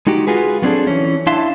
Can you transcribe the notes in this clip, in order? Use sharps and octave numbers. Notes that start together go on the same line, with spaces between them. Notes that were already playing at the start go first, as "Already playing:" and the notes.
G#3 D#4 F#4 G4
F4 F#4 G#4 B4
F#3 B3 C4 D4 G#4 A4
E3 C#4
D4 E4 E5 F5 A5 C6